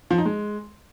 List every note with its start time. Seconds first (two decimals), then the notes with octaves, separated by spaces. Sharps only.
0.11 F3
0.18 D#4
0.26 G#3